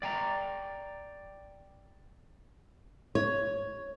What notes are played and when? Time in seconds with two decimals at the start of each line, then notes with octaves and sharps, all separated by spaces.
0.02 D5 G5 G#5 A#5
3.15 C#5